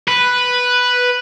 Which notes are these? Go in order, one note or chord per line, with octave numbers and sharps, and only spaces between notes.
B4